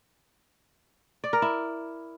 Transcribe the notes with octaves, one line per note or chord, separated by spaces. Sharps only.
D5
A#4
E4